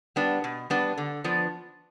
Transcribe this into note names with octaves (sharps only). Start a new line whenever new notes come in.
G3 B3 D4
B2
G3 B3 D4
D3
F3 B3 D4